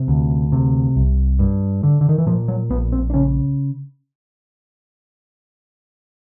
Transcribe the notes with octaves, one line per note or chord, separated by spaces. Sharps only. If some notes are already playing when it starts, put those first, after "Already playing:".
Already playing: C3
D2
C3
C2
G2
D3
D3
D#3
E3
A#2 F3
F#3
A#1 B3
C4
D4
C#3 C#4